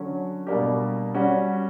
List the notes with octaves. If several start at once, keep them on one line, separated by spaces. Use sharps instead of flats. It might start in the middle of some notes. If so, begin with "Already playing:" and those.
Already playing: D3 F#3 C#4
B2 G3 A#3 D4 G4
G3 C#4 F#4